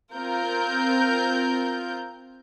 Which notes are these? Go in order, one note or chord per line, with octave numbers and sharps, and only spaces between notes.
C4 F4 A#4 G6